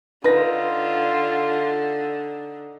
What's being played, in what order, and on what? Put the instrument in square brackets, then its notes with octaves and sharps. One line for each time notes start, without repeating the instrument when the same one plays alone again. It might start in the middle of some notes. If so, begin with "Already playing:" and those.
[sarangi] D3 [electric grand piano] D#4 A#6 [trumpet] F4 [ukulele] B4